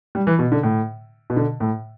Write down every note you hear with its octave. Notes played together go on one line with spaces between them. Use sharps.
G3
E3
B2
D3
A2
B2
D3
A2